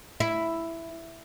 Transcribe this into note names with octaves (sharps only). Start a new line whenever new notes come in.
E4